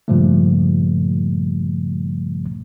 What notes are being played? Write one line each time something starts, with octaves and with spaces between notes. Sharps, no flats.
G2 A#2 C#3 F3 G3 A3